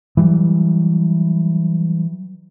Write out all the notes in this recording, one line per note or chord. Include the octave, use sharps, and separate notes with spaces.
E3 F#3 G3